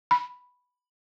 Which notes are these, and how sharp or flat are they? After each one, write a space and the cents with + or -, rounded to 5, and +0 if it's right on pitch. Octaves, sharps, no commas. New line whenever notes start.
B5 +0